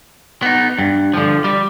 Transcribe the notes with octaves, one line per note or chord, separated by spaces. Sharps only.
B3 D#4
G2
D3 F3
G3